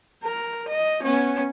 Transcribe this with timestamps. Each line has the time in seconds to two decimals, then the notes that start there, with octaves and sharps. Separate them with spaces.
0.23 A#4
0.68 D#5
1.02 B3 C#4